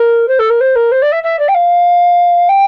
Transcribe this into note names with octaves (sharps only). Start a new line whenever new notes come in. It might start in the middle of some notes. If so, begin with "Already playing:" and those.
Already playing: A#4
C5
A4
A#4
C5
A#4
C5
D5
E5
E5
D5
G5
F5
G5